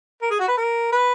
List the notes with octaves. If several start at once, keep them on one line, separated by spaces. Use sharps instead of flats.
A#4
G#4
F#4
B4
A#4
B4